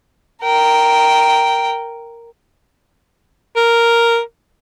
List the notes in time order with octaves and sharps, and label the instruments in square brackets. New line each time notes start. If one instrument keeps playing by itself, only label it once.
[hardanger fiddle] A#4 G5
[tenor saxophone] A#4